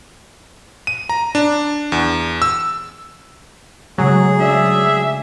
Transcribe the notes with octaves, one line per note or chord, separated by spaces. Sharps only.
D#7
A#5
D4
E2
E6
C#3 F#3 G#3 A3 G#4
D4 D5 E5 F5